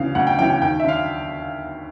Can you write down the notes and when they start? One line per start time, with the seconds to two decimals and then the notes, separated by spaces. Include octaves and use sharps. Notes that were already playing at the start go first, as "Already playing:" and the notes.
Already playing: D2 C#3 E3 F5
0.15 D2 F#5
0.27 G5
0.39 C#3 E3 G5
0.50 G5
0.62 D#2 G5
0.80 E5
0.84 D3 F5